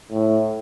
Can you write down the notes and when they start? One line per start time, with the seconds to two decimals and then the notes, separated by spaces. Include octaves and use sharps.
0.12 A2